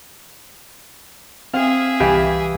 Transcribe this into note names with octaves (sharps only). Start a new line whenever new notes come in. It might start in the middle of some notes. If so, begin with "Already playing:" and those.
C4 G#4 E5 F5
C2 E3 G4 F5 G#5